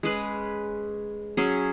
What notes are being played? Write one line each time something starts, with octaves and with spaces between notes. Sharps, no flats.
G#3 C#4 G#4 B4
F#3 C#4 G#4